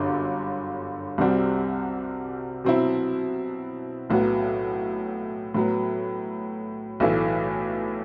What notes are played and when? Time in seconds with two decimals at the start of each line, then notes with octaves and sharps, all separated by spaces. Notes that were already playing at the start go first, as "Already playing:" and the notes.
Already playing: G1 F#2 D3
1.18 C2 C3 G3 C4 F#4
2.64 B2 F#3 C4 E4
4.10 B1 A2 F#3 B3 F#4
5.54 A2 F#3 B3
7.00 B1 A2 E3 A3 E4